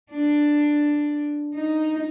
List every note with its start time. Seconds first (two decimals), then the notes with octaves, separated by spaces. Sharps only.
0.11 D4
1.55 D#4